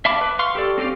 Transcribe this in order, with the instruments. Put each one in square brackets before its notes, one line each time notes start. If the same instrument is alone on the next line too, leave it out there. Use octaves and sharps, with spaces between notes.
[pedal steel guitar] E5 F5 A5 B5 D6
B4
F5 C6 C#6 F6
G4 A4 D5
C4 C#4 G4 D5 F5